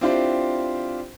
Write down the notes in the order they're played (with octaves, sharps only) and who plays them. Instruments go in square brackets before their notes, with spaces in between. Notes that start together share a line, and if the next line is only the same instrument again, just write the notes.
[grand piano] C4 D4 E4 F4 G4 C5